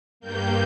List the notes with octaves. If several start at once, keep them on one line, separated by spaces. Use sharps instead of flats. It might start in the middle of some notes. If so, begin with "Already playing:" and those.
G2 G3 A#3 G6